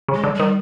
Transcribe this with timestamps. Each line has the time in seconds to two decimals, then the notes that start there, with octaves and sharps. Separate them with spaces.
0.08 C#3
0.14 G#3
0.24 D3
0.35 G3
0.40 D#3